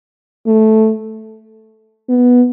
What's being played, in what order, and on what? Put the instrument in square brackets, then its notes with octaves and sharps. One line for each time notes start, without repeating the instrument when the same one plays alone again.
[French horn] A3
B3